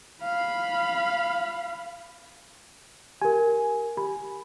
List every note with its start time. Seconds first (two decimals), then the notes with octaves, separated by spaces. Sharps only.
0.23 F5 B5
3.21 G4 A#4 G#5
3.97 G4 B5